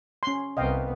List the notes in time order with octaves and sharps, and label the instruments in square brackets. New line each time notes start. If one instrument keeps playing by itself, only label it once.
[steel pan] C#4 C6
[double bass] C2 B3 [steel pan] D#5 F5 G5